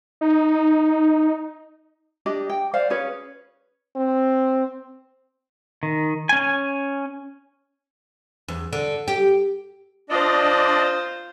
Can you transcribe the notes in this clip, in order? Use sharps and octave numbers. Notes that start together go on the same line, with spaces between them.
D#4
D4 G4 D#5
G5
C5 D5 F5
C#4 G#4 B4 C#5
C4
D#3
C#4 G#5
E2
D3
G4
D4 F4 C5 D5 D#5